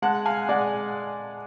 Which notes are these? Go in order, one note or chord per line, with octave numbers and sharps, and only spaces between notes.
G#3 F#5 A5
F5 G#5
G#3 D5 F#5